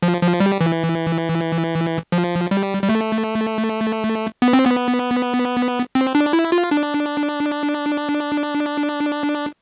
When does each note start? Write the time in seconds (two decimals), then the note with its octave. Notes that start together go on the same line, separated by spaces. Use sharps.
0.03 F3
0.22 F3
0.40 G3
0.61 E3
2.12 F3
2.51 G3
2.83 G3
2.89 A3
4.42 B3
4.53 C4
4.65 B3
5.95 C4
6.15 D4
6.33 E4
6.52 F4
6.71 D4